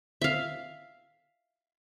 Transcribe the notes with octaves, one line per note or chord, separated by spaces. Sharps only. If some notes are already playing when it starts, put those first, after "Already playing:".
E5 F5